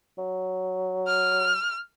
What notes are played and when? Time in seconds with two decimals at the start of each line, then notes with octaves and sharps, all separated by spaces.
0.18 F#3
1.08 F6